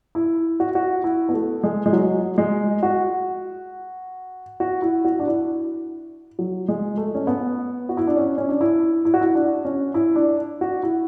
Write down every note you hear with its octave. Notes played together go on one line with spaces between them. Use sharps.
E4
F#4
F#4
E4
B3
A3
G#3
G#3
F#3
G#3
F#4
F#4
E4
F#4
D4
E4
F#3
G#3
A3
C#4
B3
F#4
E4
D4
C#4
C#4
D4
E4
E4
F#4
E4
D4
C#4
E4
D4
F#4
E4